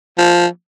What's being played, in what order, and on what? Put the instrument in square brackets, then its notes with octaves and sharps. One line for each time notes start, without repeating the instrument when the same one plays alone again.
[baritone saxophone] F3